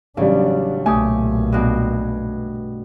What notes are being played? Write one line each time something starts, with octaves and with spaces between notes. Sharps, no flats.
A1 C#3 F#3 G3 D4
B1 A#2 A3 G4 G#5 D#6
G2 B2